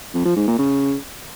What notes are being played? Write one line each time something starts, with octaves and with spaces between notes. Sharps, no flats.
F2
F3
G#2
A#2
C#3